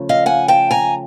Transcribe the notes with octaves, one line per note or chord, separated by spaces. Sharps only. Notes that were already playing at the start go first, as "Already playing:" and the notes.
Already playing: C#3 F3 A3
D#5 F5
F#5 G#5
G5 A5
G#5 A#5